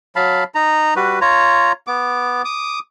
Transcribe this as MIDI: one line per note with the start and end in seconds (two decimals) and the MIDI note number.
0.16 0.44 54
0.16 0.44 77
0.16 0.44 81
0.16 0.44 83
0.55 0.94 63
0.55 0.94 82
0.96 1.19 55
0.96 1.19 66
0.96 1.19 71
1.21 1.72 65
1.21 1.72 73
1.21 1.72 82
1.87 2.42 59
1.87 2.42 86
2.45 2.79 86
2.45 2.79 87